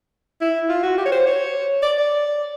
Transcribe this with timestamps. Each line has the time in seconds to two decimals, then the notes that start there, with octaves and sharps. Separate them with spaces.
0.41 E4
0.69 F4
0.83 F#4
0.98 G4
1.06 C#5
1.12 C5
1.27 C#5
1.83 D5
1.98 D5